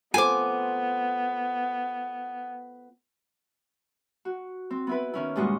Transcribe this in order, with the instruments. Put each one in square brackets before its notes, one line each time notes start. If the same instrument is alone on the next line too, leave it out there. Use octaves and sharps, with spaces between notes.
[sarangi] B3 [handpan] F4 A4 C5 [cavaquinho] G#5 D6
[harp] F#4
C4
B3 E4 B4
D#3 C#4 E4
G2 A#2 G#3 F#4 D#5 C#6